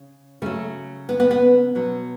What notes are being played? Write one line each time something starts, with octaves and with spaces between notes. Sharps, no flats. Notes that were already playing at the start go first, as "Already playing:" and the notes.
Already playing: C#3
C#3 F#3 A3
B3
B3
B3
B2 F#3